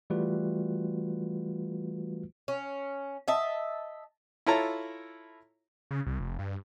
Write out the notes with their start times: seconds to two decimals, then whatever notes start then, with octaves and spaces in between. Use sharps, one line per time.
0.10 E3 G3 A3 F4 F#4 B4
2.48 C#4
3.28 D#5 E5 A5
4.47 E4 F4 A4 C#5 A5 A#5
5.91 C#3
6.06 C2
6.20 F1
6.39 G2